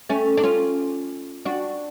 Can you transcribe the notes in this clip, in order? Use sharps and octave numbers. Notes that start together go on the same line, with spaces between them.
A3 C#4
D4
C#4 F4
D4 F#4